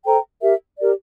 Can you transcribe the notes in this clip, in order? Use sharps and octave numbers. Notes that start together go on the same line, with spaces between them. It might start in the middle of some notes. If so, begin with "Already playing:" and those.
A4 C5 G5 A#5
G4 A#4 E5
G4 A#4 D5